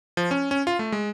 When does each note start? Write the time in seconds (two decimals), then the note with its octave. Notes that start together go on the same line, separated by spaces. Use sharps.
0.17 F3
0.31 C#4
0.51 C#4
0.67 F4
0.79 A3
0.92 G#3